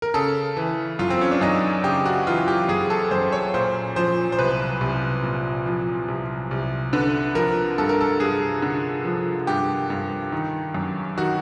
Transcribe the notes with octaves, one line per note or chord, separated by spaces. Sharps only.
A#4
C#3 A4
E3
F#2 F4
C4
C#4
D4
F#2 D#4
C#3 G4
F#4
E3 F4
G4
F#2 G#4
A4
F#2 C5
C#5
A#2 C5
F3 C5
C5
C2 B4
C2
A#2
F3
C2
C2
D3 B4
F3 A#4
G2 A4
A#4
A4
G2 G#4
D3
F3
G2 G4
G2
D#3
F#2
D#3 F#4